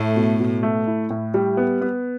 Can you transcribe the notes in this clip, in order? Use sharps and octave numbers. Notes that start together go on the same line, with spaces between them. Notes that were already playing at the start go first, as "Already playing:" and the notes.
Already playing: A2 A3
B2
B2
A3
E4
A2
G3
B3
B3